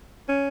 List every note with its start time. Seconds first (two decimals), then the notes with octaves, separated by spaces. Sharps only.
0.29 C#4